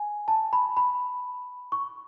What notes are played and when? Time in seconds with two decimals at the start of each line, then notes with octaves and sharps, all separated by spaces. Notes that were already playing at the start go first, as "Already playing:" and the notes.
Already playing: G#5
0.28 A5
0.53 B5
0.77 B5
1.72 C#6